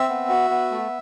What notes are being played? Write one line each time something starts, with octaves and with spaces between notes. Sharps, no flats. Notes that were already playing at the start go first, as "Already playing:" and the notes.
Already playing: C4 E5
B3
F#4
B3
A3